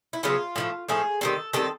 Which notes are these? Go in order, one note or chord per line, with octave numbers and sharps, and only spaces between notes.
E4
C#3 F#3 B3 F4
A2 F3 A3
A2 F3 A3 G#4
D#3 G3 C4 A4
D#3 G3 C4 A4